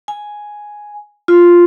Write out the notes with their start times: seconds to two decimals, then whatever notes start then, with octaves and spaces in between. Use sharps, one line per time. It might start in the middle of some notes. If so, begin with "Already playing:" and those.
0.08 G#5
1.28 F4